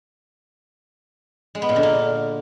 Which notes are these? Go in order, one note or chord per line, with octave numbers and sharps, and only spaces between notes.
G#3
B3
A#2
D3
A#3